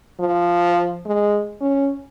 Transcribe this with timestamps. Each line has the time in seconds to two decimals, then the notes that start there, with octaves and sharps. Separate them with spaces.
0.20 F3
1.06 G#3
1.61 C#4